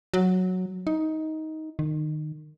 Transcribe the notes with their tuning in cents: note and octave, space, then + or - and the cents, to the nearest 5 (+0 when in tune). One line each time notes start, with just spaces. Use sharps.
F#3 -5
D#4 +15
D#3 -25